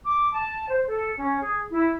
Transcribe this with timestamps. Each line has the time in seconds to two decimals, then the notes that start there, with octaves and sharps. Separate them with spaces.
0.05 D6
0.34 A5
0.68 C5
0.87 A4
1.17 C#4
1.42 G#4
1.70 E4